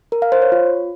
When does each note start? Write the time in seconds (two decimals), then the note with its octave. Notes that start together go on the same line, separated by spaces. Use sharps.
0.12 A#4
0.22 F5
0.32 C5
0.42 C#5
0.52 F4